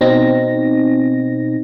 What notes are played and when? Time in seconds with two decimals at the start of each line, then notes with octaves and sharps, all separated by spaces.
0.01 B2 C4 D#4 A#6